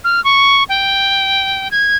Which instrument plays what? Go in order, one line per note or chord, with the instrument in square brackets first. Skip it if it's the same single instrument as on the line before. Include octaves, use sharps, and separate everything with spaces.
[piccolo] F6
C#6
G5
G#6